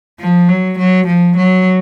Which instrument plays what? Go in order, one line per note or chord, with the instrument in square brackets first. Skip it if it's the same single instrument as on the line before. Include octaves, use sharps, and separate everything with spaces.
[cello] F3
F#3
F#3
F3
F#3